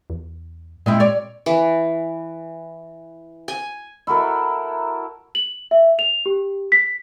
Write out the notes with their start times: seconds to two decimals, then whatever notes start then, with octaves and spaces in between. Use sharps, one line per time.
0.10 E2
0.86 A#2 G#3 C4 E4
1.00 C#5 D5
1.46 E3
3.48 G#5
4.07 E4 F#4 A4 A#4
5.35 F#7
5.71 E5
5.99 F7
6.26 G4
6.72 B6